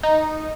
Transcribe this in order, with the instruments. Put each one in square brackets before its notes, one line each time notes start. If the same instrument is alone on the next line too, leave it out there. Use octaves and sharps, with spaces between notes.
[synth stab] D#4